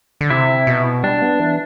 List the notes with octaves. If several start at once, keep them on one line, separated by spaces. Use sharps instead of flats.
D3
C3 E4
B2
G3 D4
B3
E3